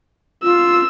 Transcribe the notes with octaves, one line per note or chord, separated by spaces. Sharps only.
F4 E6